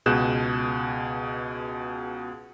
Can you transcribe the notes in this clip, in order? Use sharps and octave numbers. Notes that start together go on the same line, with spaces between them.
C#2 B2 G#4 F#6 G6 E7